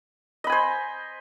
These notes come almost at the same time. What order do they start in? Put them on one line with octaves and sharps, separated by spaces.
D#5 B5 G#5 C5